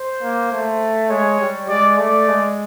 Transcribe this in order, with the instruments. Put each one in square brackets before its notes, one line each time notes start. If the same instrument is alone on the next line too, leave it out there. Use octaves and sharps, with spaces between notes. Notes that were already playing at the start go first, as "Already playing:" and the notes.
Already playing: [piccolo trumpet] C5
[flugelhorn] A#3
A3
[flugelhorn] G#3 [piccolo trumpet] C#5
[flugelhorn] G3
[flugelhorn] G#3 [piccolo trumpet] D5
[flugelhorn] A3 [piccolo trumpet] D5
[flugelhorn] G#3